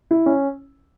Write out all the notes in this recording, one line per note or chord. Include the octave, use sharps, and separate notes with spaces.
E4
C#4